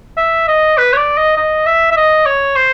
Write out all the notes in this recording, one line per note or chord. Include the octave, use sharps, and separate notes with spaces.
E5
D#5
B4
C#5
D5
D#5
D#5
E5
E5
D#5
C#5
C5